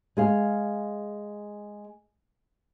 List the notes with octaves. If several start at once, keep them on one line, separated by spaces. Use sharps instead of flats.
G#3 G#4 F5